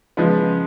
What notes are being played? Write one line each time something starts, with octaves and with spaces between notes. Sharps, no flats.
C#3 F3 G#3 B3